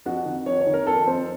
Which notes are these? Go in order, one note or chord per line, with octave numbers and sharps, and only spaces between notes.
F2 F#4
D#3
F2 C#5
C#5
D#3
A#4
F2 A4
F2 C5